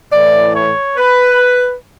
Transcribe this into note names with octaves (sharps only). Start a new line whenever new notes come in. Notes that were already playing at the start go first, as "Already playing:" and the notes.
A2 E3 D5
C#5
B4